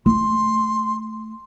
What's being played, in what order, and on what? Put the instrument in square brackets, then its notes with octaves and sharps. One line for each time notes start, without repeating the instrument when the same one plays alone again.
[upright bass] A3 [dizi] C6